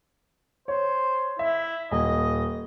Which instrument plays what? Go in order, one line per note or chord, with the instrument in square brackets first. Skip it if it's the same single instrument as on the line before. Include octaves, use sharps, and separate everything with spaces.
[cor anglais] C5 [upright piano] C#5
[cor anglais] E4 [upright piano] E5
[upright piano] D#1 [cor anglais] D#5